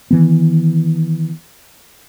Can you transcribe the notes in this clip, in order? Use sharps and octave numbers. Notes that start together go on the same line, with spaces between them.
D#3 E3 B3